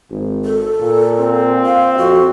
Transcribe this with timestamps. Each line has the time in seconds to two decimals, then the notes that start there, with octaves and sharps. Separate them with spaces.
0.11 G#1
0.45 A4
0.81 A#2
1.20 C4
1.66 F5
1.98 F2 F#4